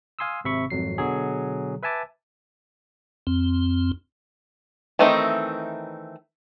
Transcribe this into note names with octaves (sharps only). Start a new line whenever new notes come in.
F5 G#5 C6 D#6 E6
G#1 C3 E5 B5 C#6
G#1 F2 F#3 C7
B2 D3 F#3 G#4
B4 E5 G#5 A5 D6
F2 C4
D#3 E3 A3 C4 D#4